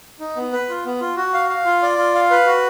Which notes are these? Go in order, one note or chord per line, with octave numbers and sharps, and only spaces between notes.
D#4
B3
B4
F4
B3
F4
F#4
F5
F5
F4
D5
F4
F5
B4
F#4